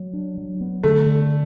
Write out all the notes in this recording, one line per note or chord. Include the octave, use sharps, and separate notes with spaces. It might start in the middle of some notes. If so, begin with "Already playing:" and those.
Already playing: F#3
D4
F#3
B3
D3 A3
D3